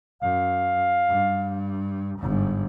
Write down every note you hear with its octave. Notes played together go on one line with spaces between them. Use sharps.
F#2 F5
G2
G1 G#2